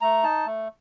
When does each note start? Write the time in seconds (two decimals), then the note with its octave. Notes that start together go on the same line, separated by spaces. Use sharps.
0.01 A3 A#5
0.23 D#4 A5
0.46 A3